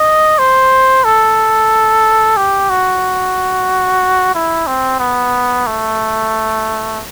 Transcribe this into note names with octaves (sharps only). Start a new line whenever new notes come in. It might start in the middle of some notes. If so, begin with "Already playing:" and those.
Already playing: D#5
C5
A4
G4
F#4
E4
C4
B3
A3